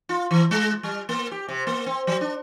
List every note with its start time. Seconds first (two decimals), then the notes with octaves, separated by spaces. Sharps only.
0.09 F4
0.31 E3
0.51 G#3
0.83 G3
1.09 A#3
1.31 G4
1.49 C3
1.67 A#3
1.86 C4
2.07 F#3
2.21 D4